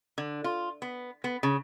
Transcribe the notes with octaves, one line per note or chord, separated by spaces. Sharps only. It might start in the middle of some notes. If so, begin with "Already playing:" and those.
D3
F4
B3
B3
C#3